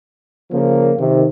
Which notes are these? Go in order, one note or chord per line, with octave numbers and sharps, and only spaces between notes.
C#3 F3 A#3
C3 D#3